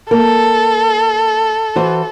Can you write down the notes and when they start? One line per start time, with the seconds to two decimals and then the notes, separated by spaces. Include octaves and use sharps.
0.11 A#3 A4 A#4
1.76 E3 F#4 C5